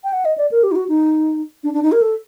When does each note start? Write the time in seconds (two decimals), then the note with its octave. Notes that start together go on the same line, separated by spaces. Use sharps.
0.04 G5
0.13 F#5
0.25 D#5
0.38 D5
0.51 A#4
0.63 G4
0.72 D#4
0.76 F#4
0.89 D#4
1.64 D4
1.74 D4
1.83 D#4
1.92 A#4
2.02 A4